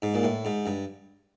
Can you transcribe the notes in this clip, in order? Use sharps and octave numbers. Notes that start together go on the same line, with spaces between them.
G#2
A#2
A2
G#2
G2